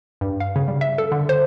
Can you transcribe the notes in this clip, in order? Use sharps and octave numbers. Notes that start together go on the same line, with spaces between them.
G2
F5
C#3
G3
E5
A4
D3
C5